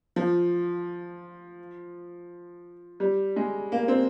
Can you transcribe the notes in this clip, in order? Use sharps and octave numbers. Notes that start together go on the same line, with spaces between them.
F3
G3
G#3
A#3
C4